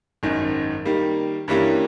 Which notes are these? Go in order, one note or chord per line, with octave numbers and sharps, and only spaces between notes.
G#1 F#2 D#3
D#3 G3 A#3
G2 E3 G3 A#3 C#4